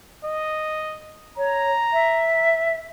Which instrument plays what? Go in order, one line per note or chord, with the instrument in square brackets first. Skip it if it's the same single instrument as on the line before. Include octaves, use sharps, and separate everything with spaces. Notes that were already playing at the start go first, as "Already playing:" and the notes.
[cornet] D#5
[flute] C#5 [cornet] A#5
[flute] E5